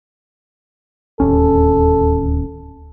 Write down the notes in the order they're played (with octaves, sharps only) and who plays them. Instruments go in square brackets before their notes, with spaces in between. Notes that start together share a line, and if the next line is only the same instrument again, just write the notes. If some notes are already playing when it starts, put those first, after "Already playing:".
[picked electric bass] D1 D#2 C#4 [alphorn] A4